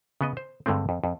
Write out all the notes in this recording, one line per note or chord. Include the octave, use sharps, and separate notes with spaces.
C#3 B3 D#5
C5
G2 D3 G#3 A3 C4
F2
F2